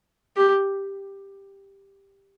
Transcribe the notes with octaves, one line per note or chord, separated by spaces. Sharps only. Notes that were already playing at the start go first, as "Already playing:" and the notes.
G4